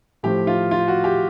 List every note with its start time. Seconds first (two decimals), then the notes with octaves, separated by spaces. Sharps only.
0.23 A2 F3 G4
0.47 F4
0.71 F4
0.88 F#4
1.04 G4